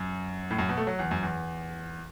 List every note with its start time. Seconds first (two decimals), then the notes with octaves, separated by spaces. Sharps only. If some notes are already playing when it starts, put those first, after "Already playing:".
Already playing: F#2
0.51 A2
0.59 F#2
0.69 B2
0.77 A3
0.87 F#3
0.99 E2
1.11 F#2
1.23 E2